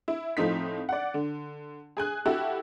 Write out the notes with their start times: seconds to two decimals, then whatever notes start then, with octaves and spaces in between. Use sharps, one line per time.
0.08 E4
0.37 A2 F3 C4 D#4 B6
0.89 D5 F#5
1.14 D3
1.97 G#4 G#5 F#6
2.26 E4 F#4 G4 A4